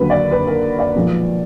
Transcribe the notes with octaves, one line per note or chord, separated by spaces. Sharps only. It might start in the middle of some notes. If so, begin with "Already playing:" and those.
Already playing: D#2 D3 F#3 A#3 B4
D5
B4
A#4
D5
B1 A#2 F3 G#3 B3